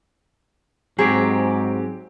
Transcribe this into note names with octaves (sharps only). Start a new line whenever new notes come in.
G#2 F#3 C4 G4 G#4